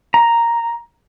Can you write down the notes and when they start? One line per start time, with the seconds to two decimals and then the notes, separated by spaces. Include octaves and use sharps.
0.14 A#5